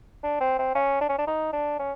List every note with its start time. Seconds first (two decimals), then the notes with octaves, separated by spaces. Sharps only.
0.23 D4
0.41 C4
0.58 C4
0.75 C#4
1.01 D4
1.09 C#4
1.19 D4
1.27 D#4
1.53 D4
1.79 C#4